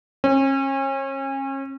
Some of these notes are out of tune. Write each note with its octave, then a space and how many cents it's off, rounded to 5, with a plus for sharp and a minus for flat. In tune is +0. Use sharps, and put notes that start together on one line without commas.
C#4 -35